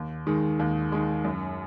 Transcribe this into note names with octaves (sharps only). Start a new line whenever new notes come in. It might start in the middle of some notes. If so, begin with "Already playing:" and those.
Already playing: D#2
D#3 G#3
D#2
D#3 G#3
F#2